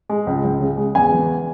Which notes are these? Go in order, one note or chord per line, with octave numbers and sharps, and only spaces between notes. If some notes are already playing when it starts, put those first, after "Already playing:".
G#3
C#2
C#2
C#3
G#3
E2 G#5
E3